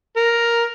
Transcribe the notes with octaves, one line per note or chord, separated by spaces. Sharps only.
A#4